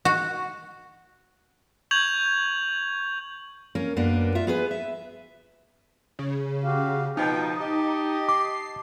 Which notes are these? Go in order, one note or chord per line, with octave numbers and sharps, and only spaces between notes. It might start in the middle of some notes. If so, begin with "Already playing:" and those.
F#4
C#6 G6 G#6 F7 F#7
A#3 C#4 A#4
F#2 A#3 B3 D4
F4 E5
B3 G#4 B4
E5
C#3
F#4 G4 F5
B2 F3 D#4 G5 A5
G4 D#5
D6 C7